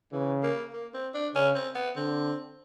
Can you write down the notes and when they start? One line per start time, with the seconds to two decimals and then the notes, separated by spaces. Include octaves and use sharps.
0.12 C#3 E3
0.43 A#3
0.74 A#3
0.94 C4
1.14 D4
1.35 C#3 C#4
1.55 C4
1.75 B3
1.96 D3 C4